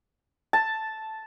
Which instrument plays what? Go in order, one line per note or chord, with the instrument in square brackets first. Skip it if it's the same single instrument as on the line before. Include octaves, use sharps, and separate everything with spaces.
[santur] A5